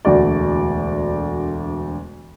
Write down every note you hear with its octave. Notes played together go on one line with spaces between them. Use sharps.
E1 D2 F#4 D5